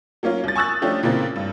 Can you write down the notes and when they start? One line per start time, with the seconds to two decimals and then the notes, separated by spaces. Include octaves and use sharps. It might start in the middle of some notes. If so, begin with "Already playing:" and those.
0.23 F#3 A#3 C#4 F4
0.44 C2 A6
0.56 G#5 C#6 D#6 E6 F#6 A6
0.82 F3 A3 C#4 D4 F4 G4
1.03 A#2 C#3 E3 A#3 C4
1.36 G2